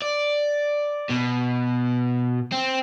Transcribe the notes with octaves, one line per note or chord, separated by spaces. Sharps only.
D5
B2
C4